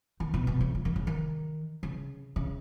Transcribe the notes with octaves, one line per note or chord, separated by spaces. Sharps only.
D#3
B2
B2
C#3
F3
D#3
C#3
D#3
C#3
C#3